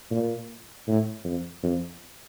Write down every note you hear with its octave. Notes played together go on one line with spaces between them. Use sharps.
A#2
A2
F2
F2